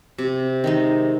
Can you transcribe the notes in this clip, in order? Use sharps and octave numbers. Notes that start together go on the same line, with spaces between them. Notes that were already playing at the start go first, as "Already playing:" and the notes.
C3
D#3 G#3 D#4